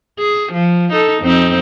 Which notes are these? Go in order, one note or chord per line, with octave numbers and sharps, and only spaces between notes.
G#4
F3
D#4 A4
F2 C4 D#4